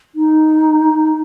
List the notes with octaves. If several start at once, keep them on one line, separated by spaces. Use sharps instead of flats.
D#4